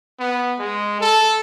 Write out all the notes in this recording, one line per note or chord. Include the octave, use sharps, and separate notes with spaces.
B3
G#3
A4